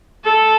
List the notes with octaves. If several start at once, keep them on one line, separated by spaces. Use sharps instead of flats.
A4